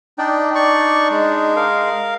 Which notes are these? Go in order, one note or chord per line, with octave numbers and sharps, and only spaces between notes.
D4 D#4 D5 G5
D5 C#6
G#3
A#4 F5